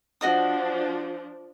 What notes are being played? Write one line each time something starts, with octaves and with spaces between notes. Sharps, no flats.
F3 D4 F#4 D#5 D#6